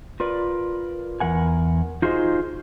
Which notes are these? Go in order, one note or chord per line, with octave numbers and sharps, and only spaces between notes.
F4 A#4 B4 D5
E2 A#4 F#5 G#5
D#4 F4 F#4 G#4 C5 D#5